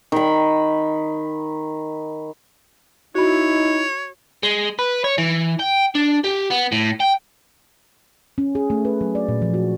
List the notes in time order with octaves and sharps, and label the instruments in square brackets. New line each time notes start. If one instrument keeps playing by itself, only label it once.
[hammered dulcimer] D#3 B5
[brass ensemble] D#4 [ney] E4 [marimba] F#4 B5 [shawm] C#5
[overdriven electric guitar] G#3
B4
C#5
E3
G5
D4
G4
B3
A2
G5
[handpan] C#4
G#4
A3
B4
F#3
D5
A#2
F3
F#4